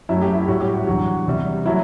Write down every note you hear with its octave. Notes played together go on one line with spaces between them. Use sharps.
F#2 F#3 A3 E4
G4
E4
A2 G3 F#4
G4
F#4
E2 D3 F#3 F#4
E2 C3 G3
F#3 A3 E4